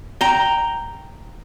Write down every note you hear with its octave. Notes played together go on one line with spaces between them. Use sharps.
G5 A#5